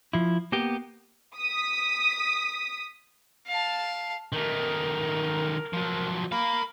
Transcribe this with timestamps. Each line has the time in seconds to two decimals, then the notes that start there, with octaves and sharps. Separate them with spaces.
0.13 F3 E4
0.52 A#3 B3 G4
1.36 D#6 B6
3.48 F5 A5
4.33 D#3 A3 A#4
5.73 F3 F#3
6.32 A#4 F5 B5